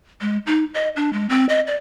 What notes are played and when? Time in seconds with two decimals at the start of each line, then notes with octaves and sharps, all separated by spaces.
0.21 G#3
0.47 D#4
0.74 D#5
0.96 D4
1.13 G#3
1.29 C4
1.49 D#5
1.67 D5